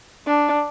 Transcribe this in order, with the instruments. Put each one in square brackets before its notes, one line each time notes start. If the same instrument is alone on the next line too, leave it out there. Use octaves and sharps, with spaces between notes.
[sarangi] D4